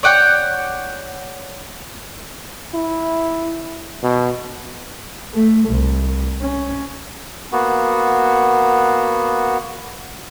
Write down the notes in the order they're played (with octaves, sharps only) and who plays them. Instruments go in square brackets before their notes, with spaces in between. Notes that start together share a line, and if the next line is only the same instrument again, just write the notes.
[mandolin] C#5 D5 F#5 G5
[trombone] E4
B2
[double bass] A3
C2
C#4
[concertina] A#3 B3 F#4